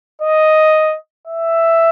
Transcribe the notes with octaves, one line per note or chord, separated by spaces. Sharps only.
D#5
E5